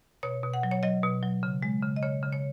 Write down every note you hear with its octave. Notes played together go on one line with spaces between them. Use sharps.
B2 C#5
B2
F#5
F#3
C#5
F#3 D#5
B2
F#3
C#3
G#3
C#3
D#5
C#3 C#5
C#3
C#5